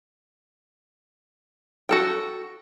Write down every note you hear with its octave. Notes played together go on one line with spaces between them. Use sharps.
F#4 A4 G5